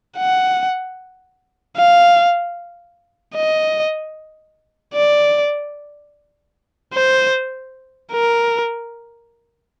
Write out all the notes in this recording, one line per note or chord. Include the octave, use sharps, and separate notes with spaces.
F#5
F5
D#5
D5
C5
A#4